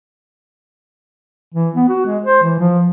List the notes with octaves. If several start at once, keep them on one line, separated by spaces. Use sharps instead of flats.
E3
B3
F#4
G#3
C5
E3
F3